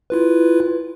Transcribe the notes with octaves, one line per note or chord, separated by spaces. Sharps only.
E4 F4 B4